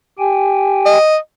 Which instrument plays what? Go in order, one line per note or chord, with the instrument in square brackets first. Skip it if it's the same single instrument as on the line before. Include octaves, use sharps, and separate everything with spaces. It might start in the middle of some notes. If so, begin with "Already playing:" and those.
[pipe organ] G4 G5 G#5
[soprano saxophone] D#5